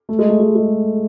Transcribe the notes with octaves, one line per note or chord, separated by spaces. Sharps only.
A3
G#3
A3
G#3
G#3